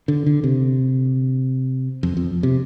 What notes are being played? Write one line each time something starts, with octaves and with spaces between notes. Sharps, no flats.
D3
D3
C3
F2
F2
C3